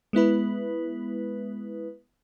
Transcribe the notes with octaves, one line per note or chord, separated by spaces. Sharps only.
G#3 B3 E4 B4